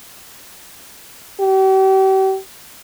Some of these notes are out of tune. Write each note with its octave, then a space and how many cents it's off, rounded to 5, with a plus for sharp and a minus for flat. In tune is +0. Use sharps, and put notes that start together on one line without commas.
G4 -40